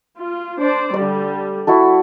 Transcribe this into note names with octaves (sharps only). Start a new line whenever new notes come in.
F4
D4 C5 D5
D3 G3 D5
E4 F#4 A4